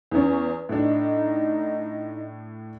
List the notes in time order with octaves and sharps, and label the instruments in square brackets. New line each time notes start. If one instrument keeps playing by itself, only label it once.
[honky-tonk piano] E2 C#4
[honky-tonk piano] A2 D4 [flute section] D#4 D#5